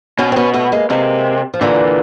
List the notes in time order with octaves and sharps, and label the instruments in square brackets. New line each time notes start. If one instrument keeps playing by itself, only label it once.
[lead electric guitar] B2 [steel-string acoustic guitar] B3 C#4
[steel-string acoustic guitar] C4
B3 C#4
A3 B3
G#3 A#3
[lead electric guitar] C3 [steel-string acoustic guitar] G#3 A#3
[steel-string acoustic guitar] F3
[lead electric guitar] A#2 [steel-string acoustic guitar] D3 E3